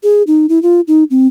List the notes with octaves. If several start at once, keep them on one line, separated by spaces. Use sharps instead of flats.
G#4
D#4
E4
F4
D#4
C4